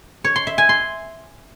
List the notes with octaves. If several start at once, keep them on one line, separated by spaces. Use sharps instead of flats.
C#5
C6
E5
G#5
C6